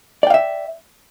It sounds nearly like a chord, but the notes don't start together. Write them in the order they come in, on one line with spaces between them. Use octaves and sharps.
D5 G5 F5 E5